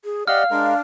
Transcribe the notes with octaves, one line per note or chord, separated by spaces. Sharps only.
G#4
G4 D5 D#5 F5 F#5 F6
G#3 D4 A#4